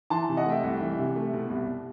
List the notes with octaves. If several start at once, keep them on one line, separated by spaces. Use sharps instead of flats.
E3 A5 C6
C3
D#5 F#5
A3 E5 G5
C2
E3
C3
A3
B2
C2